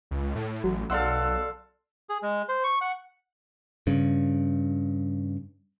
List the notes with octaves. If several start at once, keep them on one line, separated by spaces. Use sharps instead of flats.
C#2
A2
A1 F#3 F#4
B1 A4 D5 F5 F#5 C6 E6
G#4
G#3
C5
C#6
F#5
G2 C#3